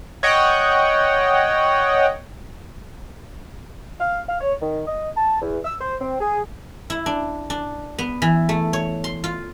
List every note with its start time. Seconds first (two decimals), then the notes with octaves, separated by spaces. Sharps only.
0.23 C#5 D#5 F#5 G5
4.00 F5
4.28 F5
4.40 C#5
4.61 D#3
4.87 D#5
5.16 A5
5.41 E2
5.65 E6
5.80 C5
6.01 C4
6.20 G#4
6.90 E4
7.06 D4
7.50 D4
7.98 B3
8.22 E3
8.49 A3
8.73 C#5
9.04 C6
9.24 F4